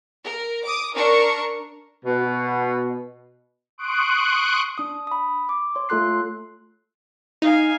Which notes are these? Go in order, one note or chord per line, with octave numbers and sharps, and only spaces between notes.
A#4
D6 D#6
D4 A#4 C#6
B2
C6 C#6 D#6 F#6 D7
D4 D#6
B5 D#6
D6
C#5 C6
A3 F4 A4 C6 F#6 C7
D#4 F5 G#5